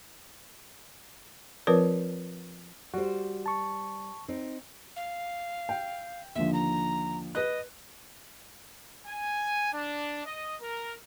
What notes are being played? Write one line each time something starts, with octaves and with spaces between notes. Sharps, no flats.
F3 C4 F4 A#4 B4 C#5
G3 F#4 C5
A5 C#6
C4 D#4
F5
G5
D#2 D3 F3 E5
A#5
B4 D#5 F#6
G#5
D4
D#5
A#4